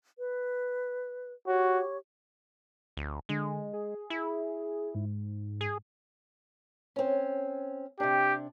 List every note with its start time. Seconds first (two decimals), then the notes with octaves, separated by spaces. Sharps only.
0.19 B4
1.47 F#4 G4 C#5 C#6
2.97 D2
3.29 D3 G#3
3.73 G#4
4.10 E4
4.95 G#2
5.61 G#4
6.96 C4 C#4
8.00 C3 D4 G4